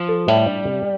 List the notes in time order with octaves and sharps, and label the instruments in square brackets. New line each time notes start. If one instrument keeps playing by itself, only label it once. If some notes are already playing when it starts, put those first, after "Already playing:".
Already playing: [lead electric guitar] F3
[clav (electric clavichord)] A4
[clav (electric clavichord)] A2 [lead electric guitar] G3
[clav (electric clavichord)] D4
C3